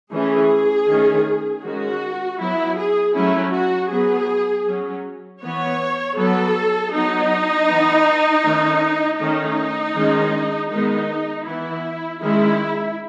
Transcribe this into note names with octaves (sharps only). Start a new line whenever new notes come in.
E3 A3 C#4 G#4
D#3 A3 C#4
D#3 G#3 C#4 F#4
F#3 B3 E4
G#4
F#3 A3 C#4 E4
F#4
F#3 B3 G#4
F#3 C#4
E3 B3 C#5
F#3 B3 A4
F#3 B3 D#4
E3 B3
D#3 A3 C#4
D#3 A3 C#4 D#4
D#3 G#3 C#4
D#3 G#3 B3 D#4
E3 B3 E4
D#3 G#3 C#4 E4